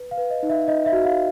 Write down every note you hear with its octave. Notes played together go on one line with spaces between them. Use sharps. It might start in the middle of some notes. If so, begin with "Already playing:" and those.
Already playing: B4
F5
B4
D#5
D#4
E5
D#4 D#5
E5
F#4
F5